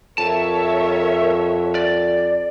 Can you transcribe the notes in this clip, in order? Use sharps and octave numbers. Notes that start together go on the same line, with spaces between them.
F2 A#4 C#5 E5 A5
D5